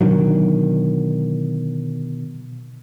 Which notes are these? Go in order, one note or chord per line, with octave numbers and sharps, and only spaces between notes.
B2 D3 D#3 F#3